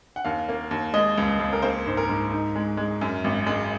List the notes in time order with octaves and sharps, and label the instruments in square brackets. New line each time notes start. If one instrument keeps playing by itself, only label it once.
[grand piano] F#5
D#2 F5
A#3
D#2
G#3 D#5
C#2
C#2
A#4
A#3 C5
G#2 C5
A#4
G#2
D#4
G#3
G#3
F#2
G#1
G#3